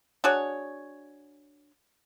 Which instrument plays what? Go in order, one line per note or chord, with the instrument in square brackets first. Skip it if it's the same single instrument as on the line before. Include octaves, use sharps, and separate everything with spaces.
[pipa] D4 F#4 G#4 C#5